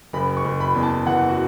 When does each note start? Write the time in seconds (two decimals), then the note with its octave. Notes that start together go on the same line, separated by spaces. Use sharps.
0.13 F#1 B5
0.37 C#6
0.44 F#1
0.60 B5
0.75 E2
0.83 A5
1.06 E3 F#5
1.29 F#4